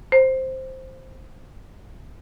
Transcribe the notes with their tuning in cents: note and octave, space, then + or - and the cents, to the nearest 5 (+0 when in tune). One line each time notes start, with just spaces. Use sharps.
C5 +5